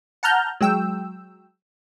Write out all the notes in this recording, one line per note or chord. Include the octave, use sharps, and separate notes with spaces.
F#5 A5 A#5 F6 G6
F#3 G#3 G5 E6